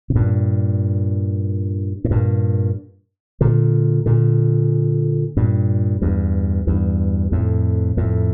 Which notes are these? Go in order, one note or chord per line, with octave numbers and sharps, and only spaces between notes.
C3
G2 A#2
A2
G2 A#2
A#2 D3
A#2 D3
G2 A#2
E2 G2
E2 G2
F2 A2
F2 A2